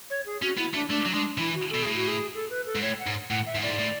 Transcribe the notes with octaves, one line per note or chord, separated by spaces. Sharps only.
C#5
G#4
C#4 F#4
B3 E4
A3 D4
A3 D4
F#3
G#3 D4
E3 E4
F#4
B2 A4
A2 G#4
F#4
G#4
A4
B4
A4
G#2
A2 C#5
F#5
G#2
A2 F#5
E5
G#2
A2 D5
G#2
A2